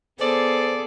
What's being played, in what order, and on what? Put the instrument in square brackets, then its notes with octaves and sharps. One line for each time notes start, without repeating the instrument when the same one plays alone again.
[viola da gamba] B3 G#4 A4 [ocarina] C5 [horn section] D5